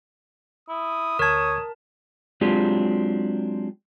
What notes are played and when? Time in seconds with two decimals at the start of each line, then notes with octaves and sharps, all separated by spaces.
0.69 E4 D#6
1.19 D2 A#4 C#5 A5 G#6
2.41 F#3 G#3 C4 D4 F4 G4